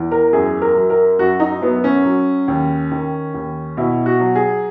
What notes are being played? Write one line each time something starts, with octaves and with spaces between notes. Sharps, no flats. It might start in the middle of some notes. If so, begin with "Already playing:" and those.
Already playing: E2
A#4
F#2 G#4
A#4
F#3
A#4
F#2 F#4
D#4
F#3 B3
C#4
F#3
D#2
D#3
D#2
B2 E4
F#4
F#3
G#4